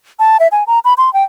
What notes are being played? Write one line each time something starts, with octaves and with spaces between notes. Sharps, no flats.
A5
E5
G#5
A#5
B5
C6
G5